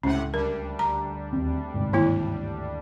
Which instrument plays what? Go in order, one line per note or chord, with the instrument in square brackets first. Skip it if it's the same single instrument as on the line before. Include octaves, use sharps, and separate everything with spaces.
[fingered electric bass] C#2 [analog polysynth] A2 C3 F#5 [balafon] C#4
[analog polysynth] D2 G3 D4 [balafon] A#4
[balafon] A#5
[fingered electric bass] D#2 C4
G1 G#2 C3
[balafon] D#3 A#3 E4